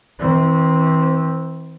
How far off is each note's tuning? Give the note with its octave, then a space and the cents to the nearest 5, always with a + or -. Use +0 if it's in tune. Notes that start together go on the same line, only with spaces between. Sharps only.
E3 -35 C4 +0